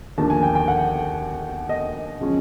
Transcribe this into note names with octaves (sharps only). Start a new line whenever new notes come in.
D#2 D3 F3 A#3 D4 A5
G#5
G5
G5
F#5
D#5
C#3 F3 G#3 C#4